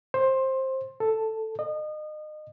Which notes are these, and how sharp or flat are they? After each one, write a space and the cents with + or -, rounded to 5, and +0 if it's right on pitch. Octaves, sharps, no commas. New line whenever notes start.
C5 +15
A4 +5
D#5 -30